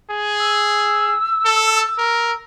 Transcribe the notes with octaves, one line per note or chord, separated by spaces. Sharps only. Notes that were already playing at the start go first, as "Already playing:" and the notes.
G#4
E6
A4
A#4